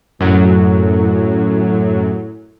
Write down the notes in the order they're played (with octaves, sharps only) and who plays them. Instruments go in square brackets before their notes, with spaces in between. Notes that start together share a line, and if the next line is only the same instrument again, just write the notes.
[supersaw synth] F#2 F#3 [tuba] A2